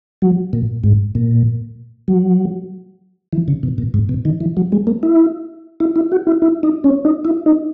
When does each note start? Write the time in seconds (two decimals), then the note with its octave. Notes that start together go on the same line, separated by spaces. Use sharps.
0.22 F#3
0.53 A#2
0.84 G#2
1.15 A#2
2.08 F#3
3.33 E3
3.48 C#3
3.63 B2
3.78 A#2
3.94 G#2
4.09 B2
4.25 D#3
4.40 E3
4.57 F#3
4.72 G#3
4.87 A#3
5.03 E4
5.80 E4
5.96 E4
6.12 F#4
6.27 E4
6.42 E4
6.63 D#4
6.84 C#4
7.05 D#4
7.25 E4
7.46 D#4